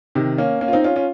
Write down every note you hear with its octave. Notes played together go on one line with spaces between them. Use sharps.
C3 D#3
A#3 C#4
A#3 C#4
F4
C4 D#4
C#4 F4
C#4 F4